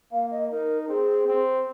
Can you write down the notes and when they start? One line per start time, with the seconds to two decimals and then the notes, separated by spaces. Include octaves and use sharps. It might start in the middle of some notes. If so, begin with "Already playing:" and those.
0.12 A#3 F5
0.31 D#5
0.51 D#4 A#4
0.88 C4 G#4
1.28 C4